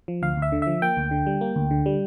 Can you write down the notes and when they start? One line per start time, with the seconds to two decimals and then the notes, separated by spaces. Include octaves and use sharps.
0.08 F3
0.22 D2 F5
0.37 D2
0.42 E5
0.52 D3
0.62 F3 E5
0.82 A#3 G5
0.97 D2
1.11 D3
1.26 G3
1.41 A#3
1.56 D2
1.71 D3
1.86 G3